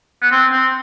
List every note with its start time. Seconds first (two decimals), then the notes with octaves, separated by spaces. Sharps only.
0.22 B3
0.31 C4
0.52 C4